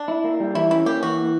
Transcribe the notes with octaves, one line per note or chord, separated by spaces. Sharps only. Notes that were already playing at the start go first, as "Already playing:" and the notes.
Already playing: D4
E4
A#3
G3
E3 E4
C#4 E4
A#3 G4
E3 F#4